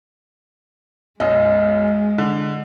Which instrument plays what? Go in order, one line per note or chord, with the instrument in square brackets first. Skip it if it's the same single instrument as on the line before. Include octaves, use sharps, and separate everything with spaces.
[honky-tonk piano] B1 F#2 [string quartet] G#3 [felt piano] D#5
[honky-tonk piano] D3